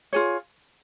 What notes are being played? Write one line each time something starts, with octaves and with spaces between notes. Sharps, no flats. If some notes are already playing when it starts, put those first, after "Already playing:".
F4 G#4 C#5